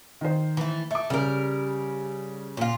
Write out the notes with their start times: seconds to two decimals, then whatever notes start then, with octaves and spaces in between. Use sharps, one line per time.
0.21 D#3 C5
0.57 E3 A3
0.91 A3 E5 D6
1.10 C#3 G3 A#4
2.57 A#2 F4